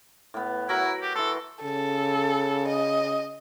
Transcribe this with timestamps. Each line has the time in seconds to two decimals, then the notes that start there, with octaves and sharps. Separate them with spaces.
0.34 A2 B3
0.69 F#3 E4 F#4 A#4
1.02 G4
1.16 E3 A4 C6
1.63 C#3 A4
2.68 D#5